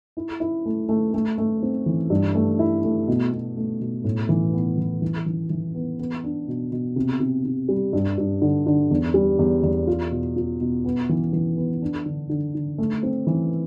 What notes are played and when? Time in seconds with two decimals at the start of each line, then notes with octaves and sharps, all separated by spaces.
0.17 E4
0.40 E4
0.66 A3
0.89 A3
1.14 A3
1.38 A3
1.62 C4
1.86 E3
2.10 G2
2.35 A3
2.59 E4
2.84 A3
3.08 B2
3.33 B2
3.57 A3
3.81 B2
4.04 A2
4.29 E3
4.53 B3
4.77 E3
5.02 E3
5.26 E3
5.50 E3
5.75 B3
5.99 B3
6.24 D4
6.48 B2
6.72 B2
6.96 C3
7.20 C3
7.44 C3
7.69 G3
7.93 G2
8.18 G2
8.42 D3
8.67 D3
8.91 E2
9.14 G3
9.39 E2
9.63 E2
9.87 F4
10.11 B2
10.36 F4
10.61 B2
10.85 B3
11.09 E3
11.33 E3
11.57 B3
11.82 D4
12.06 D3
12.30 D3
12.55 D3
12.78 A3
13.03 C4
13.27 E3